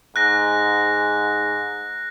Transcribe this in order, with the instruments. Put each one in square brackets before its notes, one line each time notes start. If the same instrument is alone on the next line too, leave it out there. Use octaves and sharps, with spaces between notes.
[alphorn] G#2 [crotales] F#6 A#6